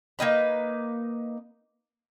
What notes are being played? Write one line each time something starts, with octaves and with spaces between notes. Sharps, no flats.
A#3 C#4 D#4 B4